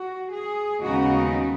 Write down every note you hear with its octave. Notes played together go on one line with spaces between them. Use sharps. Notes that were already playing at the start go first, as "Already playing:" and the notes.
Already playing: F#4
G#4
D#2 C#3 G#3 B3 D#4 F#4